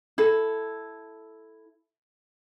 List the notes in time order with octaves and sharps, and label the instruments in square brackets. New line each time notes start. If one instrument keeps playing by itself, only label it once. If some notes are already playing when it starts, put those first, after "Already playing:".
[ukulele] E4 A4